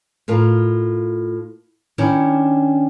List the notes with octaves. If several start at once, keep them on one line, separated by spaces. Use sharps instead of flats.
A2 F4 A#4
D#3 C#4 D4 E4 C#5